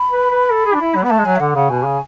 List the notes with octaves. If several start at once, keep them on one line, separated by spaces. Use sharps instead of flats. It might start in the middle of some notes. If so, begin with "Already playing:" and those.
Already playing: B5
B4
B4
A4
G#4
D4
E4
F#3
B3 B5
A3 A5
G#3
F#3 G#5
E5
D3 F#5
C#3 F#5
B2 G#5
C#3